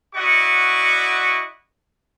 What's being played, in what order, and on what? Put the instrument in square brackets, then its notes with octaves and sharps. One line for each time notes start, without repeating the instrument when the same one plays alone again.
[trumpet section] E4 F#4 D5 D#5 F#5 C#6